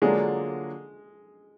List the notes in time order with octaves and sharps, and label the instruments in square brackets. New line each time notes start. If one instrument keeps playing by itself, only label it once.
[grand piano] D3 F#3 A#3 D4 F4 [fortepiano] G#3